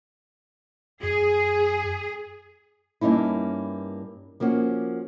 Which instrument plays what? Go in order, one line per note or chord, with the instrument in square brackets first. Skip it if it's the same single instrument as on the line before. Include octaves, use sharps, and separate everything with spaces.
[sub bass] F#2 [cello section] G#4
[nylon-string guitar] G2 A#3 C#4 D#4 E4
F3 A#3 C#4 F#4